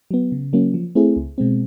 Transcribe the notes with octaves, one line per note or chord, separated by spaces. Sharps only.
F#3 B3
C#3
F#3 A#3 C#4
F3
A3 C4 E4 G#4
C#2
B2 G#3 C4